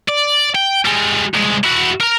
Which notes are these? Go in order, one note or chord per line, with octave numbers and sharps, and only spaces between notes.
D5
G5
G3 G#3
C2 G#3
E4 F#4
A#4 A#5